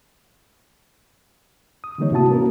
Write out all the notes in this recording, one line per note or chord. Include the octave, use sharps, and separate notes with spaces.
D#6
D3 E3 G3 A#3 D#4 C#5
A2 C3 E4 F#4 A5 D#6
A#3 B3 C#4 F#4 A#4